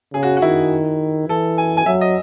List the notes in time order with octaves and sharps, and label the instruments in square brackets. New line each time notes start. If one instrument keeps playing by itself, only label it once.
[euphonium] C#3 [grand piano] G#4
[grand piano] F#4
F#4
[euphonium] D#3 [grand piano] E4
[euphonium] E3 [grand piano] A4
[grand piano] G#5
G#5
[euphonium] F#3 [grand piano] E5
[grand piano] D#5